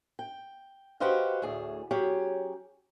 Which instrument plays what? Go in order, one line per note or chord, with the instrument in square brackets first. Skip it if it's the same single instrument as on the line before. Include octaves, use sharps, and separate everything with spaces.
[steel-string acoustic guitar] G5
F#4 G4 B4 C5 D#5 F5
D2 A2 G#4
F#3 C#4 G4 G#4